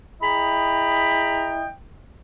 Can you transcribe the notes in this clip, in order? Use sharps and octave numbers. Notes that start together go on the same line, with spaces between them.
E4 G#4 D#5 G5 A#5 B5